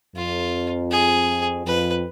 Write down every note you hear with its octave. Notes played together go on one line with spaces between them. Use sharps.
F2 F4
G#4
F2 B4